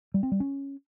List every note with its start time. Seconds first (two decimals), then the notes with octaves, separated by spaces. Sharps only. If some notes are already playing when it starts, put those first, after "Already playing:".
0.14 G3
0.23 C4
0.32 G3
0.40 C#4